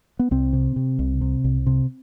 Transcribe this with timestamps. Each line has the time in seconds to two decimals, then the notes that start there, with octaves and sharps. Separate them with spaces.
0.19 B3
0.31 C2 C4
0.53 C3
0.76 C3
0.99 C2
1.21 C3
1.44 C2
1.67 C3